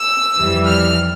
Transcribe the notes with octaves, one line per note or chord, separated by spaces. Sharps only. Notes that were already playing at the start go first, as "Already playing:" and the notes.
Already playing: E6
F2 E3 G3
F6